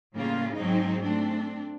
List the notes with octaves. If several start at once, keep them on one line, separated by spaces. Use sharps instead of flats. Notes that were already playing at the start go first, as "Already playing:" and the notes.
A2 C#3 G3 A#3 C#4 F4
G#2 F#3 G#3 C4 D#4
A3 C4 D4